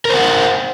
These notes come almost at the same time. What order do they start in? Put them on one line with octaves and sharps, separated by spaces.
A#4 C5 F#5